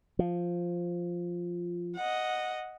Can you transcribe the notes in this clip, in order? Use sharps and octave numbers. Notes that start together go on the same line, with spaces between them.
F3
D#5 F#5